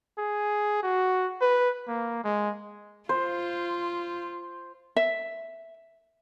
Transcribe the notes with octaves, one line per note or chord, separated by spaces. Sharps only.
G#4
F#4
B4
A#3
G#3
F4 C5
E5